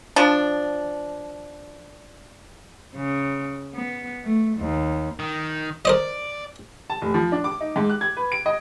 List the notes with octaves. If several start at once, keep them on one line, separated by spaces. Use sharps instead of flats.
F3 D4
C#3
B3
A3
D#2
D#3
A#4 C5 D5 D#5
A5
F1
F3
D4
D6
D#4
G#2
F#6
G#6
B4
D7
D#5